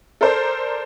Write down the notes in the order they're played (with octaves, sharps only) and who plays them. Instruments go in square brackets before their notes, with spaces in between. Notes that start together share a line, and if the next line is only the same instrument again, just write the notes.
[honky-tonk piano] A4 A#4 C5 D5